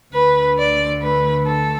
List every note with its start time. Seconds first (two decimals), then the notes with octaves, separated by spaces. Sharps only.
0.14 D2 D3 A3 B4
0.58 D5
1.02 B4
1.45 A4